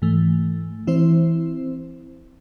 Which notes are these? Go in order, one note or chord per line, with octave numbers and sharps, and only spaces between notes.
G#2 E3 A3
E3 C4 E4 C5